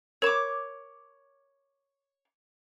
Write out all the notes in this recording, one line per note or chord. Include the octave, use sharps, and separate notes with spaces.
A#4 C#5 B5 D6